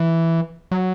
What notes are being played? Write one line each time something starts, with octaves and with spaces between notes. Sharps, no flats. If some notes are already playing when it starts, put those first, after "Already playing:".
Already playing: E3
F#3